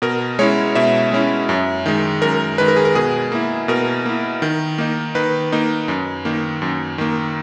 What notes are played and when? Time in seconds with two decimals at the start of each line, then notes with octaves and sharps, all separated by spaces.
0.02 B2 A#4
0.39 G#3 C#4 E4 C#5
0.75 B2 E5
1.12 G#3 C#4 E4
1.49 F#2
1.86 D#3 G#3
2.22 F#2 A#4
2.58 D#3 G#3 B4
2.68 A#4
2.76 G#4
2.85 A#4
2.95 B2 G#4
3.32 A#3 E4
3.68 B2 A#4
4.06 A#3 E4
4.42 D#3
4.78 A#3 D#4
5.15 D#3 B4
5.52 A#3 D#4
5.88 F#2
6.25 D#3 A#3
6.62 F#2
6.98 D#3 A#3